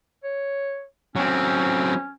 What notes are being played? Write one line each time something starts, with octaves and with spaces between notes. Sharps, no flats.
C#5
F#3 C4 C#4